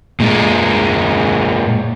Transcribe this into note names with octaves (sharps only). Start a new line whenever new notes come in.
A#2 G#3